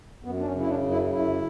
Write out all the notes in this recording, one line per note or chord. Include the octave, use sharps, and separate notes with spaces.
F#2 B3
D4
C#4
C#3
E4
D4
F#2
E4
F#2 E4